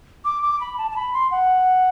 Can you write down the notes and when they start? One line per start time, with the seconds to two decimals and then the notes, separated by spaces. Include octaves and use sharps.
0.25 D6
0.43 D6
0.61 B5
0.78 A5
0.91 A5
0.96 B5
1.14 C6
1.31 F#5